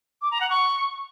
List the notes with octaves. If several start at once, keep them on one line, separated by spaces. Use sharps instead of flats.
D6
A#5
F#5
C#6